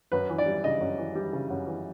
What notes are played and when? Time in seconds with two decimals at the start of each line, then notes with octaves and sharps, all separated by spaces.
0.12 F#2 B4
0.29 E3
0.38 D5
0.46 G3
0.64 C#3 D#5
0.81 F#2
0.98 E3
1.15 G3
1.33 C#3
1.50 F#2
1.67 E3